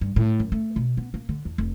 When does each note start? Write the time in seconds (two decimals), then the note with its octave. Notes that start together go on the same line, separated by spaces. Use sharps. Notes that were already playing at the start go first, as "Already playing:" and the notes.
0.01 G2
0.16 A2
0.40 F#2
0.52 A3
0.76 B2
0.97 B3
1.14 A#3
1.29 D3
1.45 E2
1.58 F1